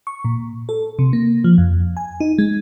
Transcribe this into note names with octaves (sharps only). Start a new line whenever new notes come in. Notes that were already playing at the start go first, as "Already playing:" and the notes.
C#6
A#2
A4
C3
A#3
F3
F2
G#5
D#4
G#3